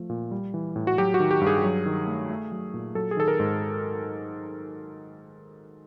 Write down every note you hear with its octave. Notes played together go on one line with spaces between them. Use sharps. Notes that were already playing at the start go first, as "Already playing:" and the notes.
Already playing: F3 A3
A#2
G3
E3
A2
F#4
F#3 G4
F#4
D#3
G4
G2
G#4
F#3
D#3
A3
A3
F#3
A#2
F#3 A4
G#4
D#3 A4
A#4
G#2